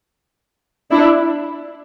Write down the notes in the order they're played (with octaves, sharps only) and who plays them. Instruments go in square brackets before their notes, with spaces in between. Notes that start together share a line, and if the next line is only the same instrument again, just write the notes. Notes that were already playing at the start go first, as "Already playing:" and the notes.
[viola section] D4 E4